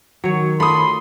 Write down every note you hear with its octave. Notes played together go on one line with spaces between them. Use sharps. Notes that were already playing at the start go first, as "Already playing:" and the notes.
D#3 F#3 C#5
A3 F4 B5 C6 D#6